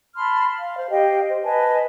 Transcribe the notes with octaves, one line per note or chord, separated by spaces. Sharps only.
A5 B5 C6 F6
F5
C5
G4 D#5 F5 G5
C5
B4 D#5 G#5 A5